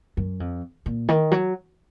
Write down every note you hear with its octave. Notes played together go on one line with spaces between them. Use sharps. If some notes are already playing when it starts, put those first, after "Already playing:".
F#2
F2
A#2
D#3
F#3